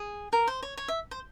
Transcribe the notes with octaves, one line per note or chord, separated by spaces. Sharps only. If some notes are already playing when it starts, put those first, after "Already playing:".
Already playing: G#4
A#4
C5
C#5
C#5
E5
C5